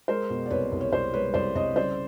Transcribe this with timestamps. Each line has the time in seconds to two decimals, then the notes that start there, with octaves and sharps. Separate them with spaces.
0.08 G#3 A#4 C5
0.30 B2
0.46 D5
0.50 C2 B4 C#5
0.72 C2
0.81 C#5
0.92 C2 C5 D5
1.13 G#3 B4 C#5
1.34 C2 C5 D5
1.55 C2 C#5 D#5
1.76 C#3 C5 D5